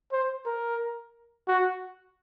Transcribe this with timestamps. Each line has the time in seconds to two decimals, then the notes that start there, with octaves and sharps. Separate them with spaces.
0.12 C5
0.46 A#4
1.48 F#4